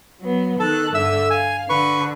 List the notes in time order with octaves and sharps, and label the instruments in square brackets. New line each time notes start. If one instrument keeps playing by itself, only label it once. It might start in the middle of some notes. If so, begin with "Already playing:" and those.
[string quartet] F#3 B3
[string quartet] D#3 F#6 [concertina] A4
[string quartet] G2 D3 A3 [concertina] E5 E6
[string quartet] F5 [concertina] G#5
[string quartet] D3 [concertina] B4 C#6